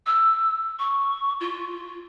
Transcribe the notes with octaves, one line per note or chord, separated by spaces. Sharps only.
E6
C#6
F4